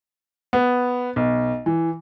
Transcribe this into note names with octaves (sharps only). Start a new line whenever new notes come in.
B3
B1
E3